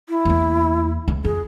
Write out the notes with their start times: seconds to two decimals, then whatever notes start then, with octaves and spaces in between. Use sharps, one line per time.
0.09 E4
0.25 E2 A#3
1.08 C#2
1.25 F2 G#4